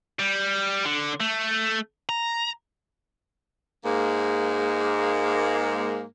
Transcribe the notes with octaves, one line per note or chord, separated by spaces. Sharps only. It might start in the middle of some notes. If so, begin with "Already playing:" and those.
G3
D3
A3
A#5
G#2 G#3 A#3